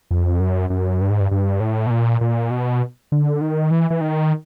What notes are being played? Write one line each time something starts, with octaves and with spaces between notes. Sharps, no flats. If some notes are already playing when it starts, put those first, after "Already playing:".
F2
F#2
F#2
G2
G#2
G2
G2
A2
B2
A#2
A#2
B2
D3
D#3
E3
E3
D#3